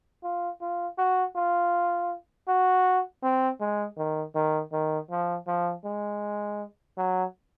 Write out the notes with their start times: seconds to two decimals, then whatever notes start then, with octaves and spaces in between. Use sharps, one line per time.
0.23 F4
0.61 F4
0.98 F#4
1.36 F4
2.48 F#4
3.23 C4
3.60 G#3
3.97 D#3
4.35 D#3
4.72 D#3
5.10 F3
5.47 F3
5.84 G#3
6.98 F#3